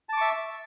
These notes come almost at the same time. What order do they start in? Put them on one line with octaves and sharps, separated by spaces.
A5 D6 C#6 E5